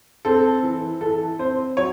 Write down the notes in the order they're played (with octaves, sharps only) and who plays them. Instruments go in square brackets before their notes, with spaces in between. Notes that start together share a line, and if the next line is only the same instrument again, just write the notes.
[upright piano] C4 A4
E3
E3 A4
C4 C5
F#3 C#5